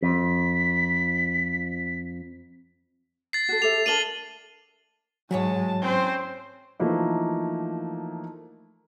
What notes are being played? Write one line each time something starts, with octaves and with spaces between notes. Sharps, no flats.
F2 B6
A6 C7
F#4 A4
G4 A4 E5 F7
D4 A#4 A5 D#7 F#7 G7
G#2 E3 F#3 G#3 F#4 C#5 A5
C4 C#4 C5
E3 F3 A3 A#3 D#4